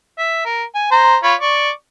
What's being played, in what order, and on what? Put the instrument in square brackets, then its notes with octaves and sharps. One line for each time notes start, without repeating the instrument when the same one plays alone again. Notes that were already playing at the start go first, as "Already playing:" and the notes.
[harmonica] E5
A#4
G#5
C5 A#5
F4 C#5 B5
D5 C#6